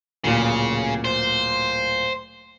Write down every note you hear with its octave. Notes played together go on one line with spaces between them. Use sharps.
D1 A#2 C#3
C5